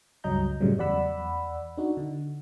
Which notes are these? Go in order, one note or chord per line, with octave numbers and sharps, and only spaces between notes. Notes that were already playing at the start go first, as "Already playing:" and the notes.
C#2 G2 F#3 D#5 A#5 G6
F#2 A2 C#3 F#3 G3
E2 D5 F#5 B5 E6
D4 D#4 F#4
D3